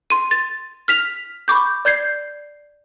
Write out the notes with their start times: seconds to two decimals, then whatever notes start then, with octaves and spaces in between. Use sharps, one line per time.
0.10 C6 D#7
0.31 A6
0.88 F6 B6 F7
1.48 B5 C#6 D6 G6
1.85 D5 G6 G#6 C7